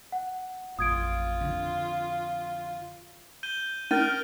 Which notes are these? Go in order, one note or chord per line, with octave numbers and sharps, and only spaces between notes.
F#5
A1 F2 F4 D#6 G#6 D7
F2 D3
G6 D#7 G7
C#4 A#4 F6 A6 D#7